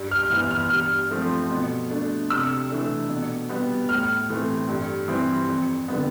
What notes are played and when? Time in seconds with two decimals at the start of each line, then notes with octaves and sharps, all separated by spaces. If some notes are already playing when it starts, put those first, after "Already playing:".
Already playing: G2
0.11 F6
0.30 E3 B3 F6
0.51 F6
0.70 G2 F6
1.11 F3 A3 C4
1.51 B2
1.90 A3 D4
2.30 C3 E6
2.70 E3 A3 D4
3.09 B2
3.49 G3 B3
3.89 A2 F6
4.30 E3 A3 C4
4.69 G2
5.08 E3 G3 C4
5.49 F2
5.88 D3 G3 B3